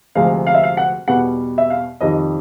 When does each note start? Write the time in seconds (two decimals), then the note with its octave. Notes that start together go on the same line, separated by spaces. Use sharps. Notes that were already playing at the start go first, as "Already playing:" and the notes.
0.15 D2 C3 F3 G#3 F5
0.47 F5
0.55 E5
0.63 F5
0.77 F#5
1.08 E2 B2 G3 F#5
1.58 E5
1.70 F5
2.01 F2 C3 D#3 G3 D#5